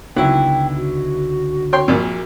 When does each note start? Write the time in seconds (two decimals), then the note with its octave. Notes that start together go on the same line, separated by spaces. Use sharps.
0.16 C#2 D3 F#3 B3 D#4 E4 G5
0.76 F#4
1.73 C#5 G5 C6
1.88 A#1 A#2